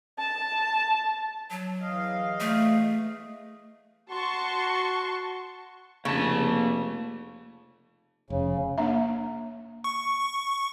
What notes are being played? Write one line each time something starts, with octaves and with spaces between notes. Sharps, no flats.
A5
F#3
E2 D#5 F5
A3
F#4 A5 C6 C#6
F1 C#3 A#3 A5
F1 C#3
A#3 D4 E5
C#6